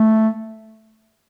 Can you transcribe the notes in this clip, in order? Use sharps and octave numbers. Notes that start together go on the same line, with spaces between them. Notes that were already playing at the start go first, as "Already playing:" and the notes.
Already playing: A3